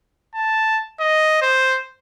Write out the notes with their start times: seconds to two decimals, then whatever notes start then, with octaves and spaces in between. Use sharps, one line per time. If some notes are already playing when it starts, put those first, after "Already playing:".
0.35 A5
1.00 D#5
1.42 C5